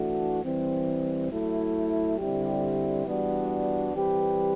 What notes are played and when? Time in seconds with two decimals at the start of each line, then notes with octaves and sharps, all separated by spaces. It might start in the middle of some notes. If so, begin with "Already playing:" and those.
Already playing: E3 A3 D4 F#4
0.43 E3 G3 C4
1.31 F#3 A3 E4
2.18 D3 G3 C4 E4 G4
3.06 E3 G3 B3 D4 F#4
3.93 E3 G3 C4 G4 B4